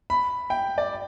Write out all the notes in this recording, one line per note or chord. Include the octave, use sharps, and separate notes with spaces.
B5
G5
D5